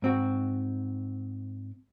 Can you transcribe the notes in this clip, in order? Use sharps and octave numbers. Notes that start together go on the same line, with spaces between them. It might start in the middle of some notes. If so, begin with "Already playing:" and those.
G#2 C4 F#4